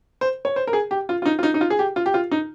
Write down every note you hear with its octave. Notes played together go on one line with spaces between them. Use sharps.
C5
C#5
C5
A#4
G#4
G4
F4
F4
D#4
F4
D#4
D#4
F4
G#4
G4
F4
G4
F4
D#4